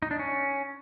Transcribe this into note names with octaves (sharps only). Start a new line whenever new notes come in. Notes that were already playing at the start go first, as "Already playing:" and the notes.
D#4
D4
C#4